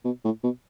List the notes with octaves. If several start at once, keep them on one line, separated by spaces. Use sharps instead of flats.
B2
A2
B2